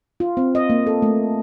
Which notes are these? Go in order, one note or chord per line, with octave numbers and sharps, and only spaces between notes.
F4
C4
D#5
A#3
A4
A3